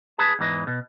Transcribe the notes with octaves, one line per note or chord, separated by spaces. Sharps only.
G#4 B4 A5
E2 G#2 E3 D#5
B2